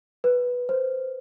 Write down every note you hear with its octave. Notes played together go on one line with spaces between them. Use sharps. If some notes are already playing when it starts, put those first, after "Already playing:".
B4
C5